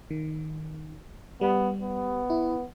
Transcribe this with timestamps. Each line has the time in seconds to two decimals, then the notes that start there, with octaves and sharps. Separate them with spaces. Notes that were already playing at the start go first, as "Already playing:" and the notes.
0.10 D#3
1.41 G3 B3
1.81 B3
2.30 E4